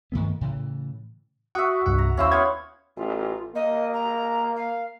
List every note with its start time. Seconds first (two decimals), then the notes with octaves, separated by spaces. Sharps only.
0.12 G2 D#3 A3 B3
0.41 A2 C#3 E3
1.55 F#4 E5 F#5 C#6 D#6
1.86 C2 G2 F#5
1.98 A#5
2.17 D#2 C#4 E4 C5 F5 E6
2.32 B3 F5 C#6 D#6 G#6
2.97 A1 F4
3.55 A#3 D#5
3.94 A#5
4.56 F5